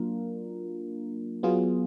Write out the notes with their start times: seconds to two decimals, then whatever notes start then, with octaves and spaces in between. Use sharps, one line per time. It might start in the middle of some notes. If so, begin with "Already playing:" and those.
Already playing: F#3 A#3 D4 F4 A#4
1.43 F#3 B3 F4 G#4